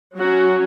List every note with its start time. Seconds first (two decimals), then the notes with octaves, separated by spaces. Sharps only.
0.17 F#3 C#4 F#4